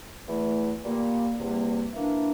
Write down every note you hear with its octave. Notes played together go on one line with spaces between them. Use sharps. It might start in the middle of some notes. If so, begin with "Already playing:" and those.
E2 E3 A3
A#2 G3 A#3
E2 C3 G3 A#3
E3 A#3 D4